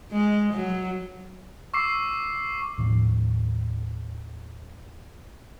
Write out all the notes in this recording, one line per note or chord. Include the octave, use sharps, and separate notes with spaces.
G#3
F#3
C#6 D6 E6 C7
D#2 A2 F3 C4